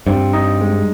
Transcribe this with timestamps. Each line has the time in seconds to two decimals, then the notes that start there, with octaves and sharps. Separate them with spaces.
0.07 G2 C4
0.33 D#4
0.61 G#3